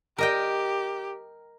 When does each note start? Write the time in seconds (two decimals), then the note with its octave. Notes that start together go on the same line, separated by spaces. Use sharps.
0.18 G4 A#4 D#5 G5